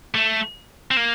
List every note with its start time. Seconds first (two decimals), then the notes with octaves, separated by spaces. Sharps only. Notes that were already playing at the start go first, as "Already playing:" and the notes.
0.15 A3
0.91 C4
0.97 A#3